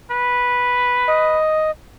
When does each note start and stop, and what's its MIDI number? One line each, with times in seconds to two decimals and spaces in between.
0.11 1.37 71
1.08 1.71 75